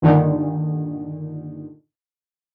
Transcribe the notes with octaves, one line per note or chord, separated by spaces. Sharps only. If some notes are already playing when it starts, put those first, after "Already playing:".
G2 A#2 D3 D#3